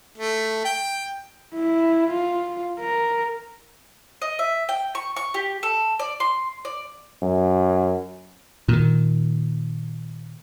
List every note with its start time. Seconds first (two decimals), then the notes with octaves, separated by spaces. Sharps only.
0.18 A3
0.65 G5
1.55 E4
2.10 F4
2.80 A#4
4.22 D#5
4.39 E5
4.69 G5
4.95 C#6
5.16 C#6
5.34 G4
5.63 A4
5.99 D5
6.20 C6
6.65 D5
7.22 F#2
8.68 A#2 D#3